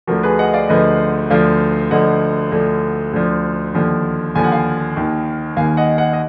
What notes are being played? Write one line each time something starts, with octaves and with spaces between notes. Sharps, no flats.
D2 D3 F3 F#4 A#4
G#4 B4
D#5 F#5
D5 F5
D2 D3 F3 B4 D#5
D2 D3 F3 D5 F5
D2 D3 F3 D#5 F#5
D2 D3 F3
D2 D3 F3
D#2 D3 F3
D#2 D3 F3 G#5
F#5
F5 G#5
D#2 D#3
D#2 D#3 F5 G#5
D#5 F#5
D#5 F#5
D#5